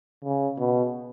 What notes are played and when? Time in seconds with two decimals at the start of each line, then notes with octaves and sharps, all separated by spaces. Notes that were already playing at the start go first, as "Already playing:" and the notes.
0.25 C#3
0.59 B2